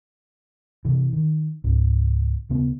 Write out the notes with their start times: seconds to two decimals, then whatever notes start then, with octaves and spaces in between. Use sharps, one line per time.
0.85 C3 E3
1.13 D#3
1.64 C#2 G#2
2.49 D#2 C#3 B3